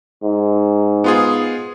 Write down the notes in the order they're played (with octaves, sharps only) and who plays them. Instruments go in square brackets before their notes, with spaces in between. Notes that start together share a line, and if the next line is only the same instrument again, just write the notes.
[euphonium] G#2
[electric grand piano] B3 F4 G#4